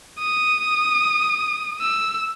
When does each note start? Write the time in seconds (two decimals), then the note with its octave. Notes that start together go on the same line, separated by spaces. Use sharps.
0.19 D#6
1.80 E6